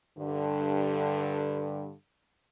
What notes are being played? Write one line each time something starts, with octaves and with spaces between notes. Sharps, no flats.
G2 D3